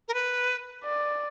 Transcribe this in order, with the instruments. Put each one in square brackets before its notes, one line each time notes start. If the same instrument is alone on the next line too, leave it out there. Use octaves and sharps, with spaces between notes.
[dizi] A#4
B4
[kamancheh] D5